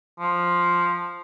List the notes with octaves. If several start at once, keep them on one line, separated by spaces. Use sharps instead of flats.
F3